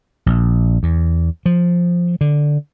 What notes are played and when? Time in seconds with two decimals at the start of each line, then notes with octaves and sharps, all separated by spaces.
0.26 A#1
0.83 E2
1.46 F3
2.21 D3